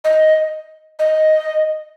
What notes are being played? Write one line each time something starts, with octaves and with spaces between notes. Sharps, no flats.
D#5
D#5